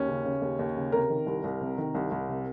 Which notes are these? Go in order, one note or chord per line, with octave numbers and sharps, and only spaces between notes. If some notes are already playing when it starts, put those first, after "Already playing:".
Already playing: D#2 C#4
C#3
C#3
D#2
D#2
C#3
C3 A#4
D#3
C2
C2
C3
D#3
C2
C2
C3